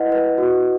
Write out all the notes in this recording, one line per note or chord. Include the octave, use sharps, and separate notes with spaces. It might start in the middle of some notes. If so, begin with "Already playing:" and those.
Already playing: E4 B4 D#5 F#5
B4
F#4